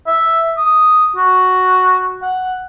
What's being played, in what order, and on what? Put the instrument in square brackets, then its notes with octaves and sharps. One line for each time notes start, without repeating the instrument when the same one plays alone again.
[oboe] E5
D#6
F#4
F#5